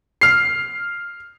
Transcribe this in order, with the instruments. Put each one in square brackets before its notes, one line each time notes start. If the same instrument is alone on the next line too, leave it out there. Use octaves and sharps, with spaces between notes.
[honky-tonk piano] F6 C7